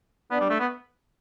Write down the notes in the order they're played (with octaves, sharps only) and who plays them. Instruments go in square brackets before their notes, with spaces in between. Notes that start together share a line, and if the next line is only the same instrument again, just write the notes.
[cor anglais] B3 [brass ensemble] D4
[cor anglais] G3
A3
B3